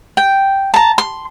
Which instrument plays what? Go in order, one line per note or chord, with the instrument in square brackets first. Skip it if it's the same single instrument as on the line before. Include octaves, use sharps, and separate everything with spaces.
[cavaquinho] G5
A5 A#5
C6